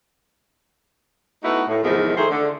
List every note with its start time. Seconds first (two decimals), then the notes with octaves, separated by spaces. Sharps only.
1.44 A3 B3 D#4 E4 F#4
1.68 A2
1.83 E2 G#2 C3 D#3 F3
2.17 D#3 A3 G#4 C5
2.30 D3